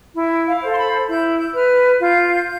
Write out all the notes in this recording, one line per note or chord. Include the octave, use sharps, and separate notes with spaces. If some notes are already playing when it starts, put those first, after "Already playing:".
E4
F5
A4 C5
C6
B5
E4 G6
G6
B4 F6
F4 G6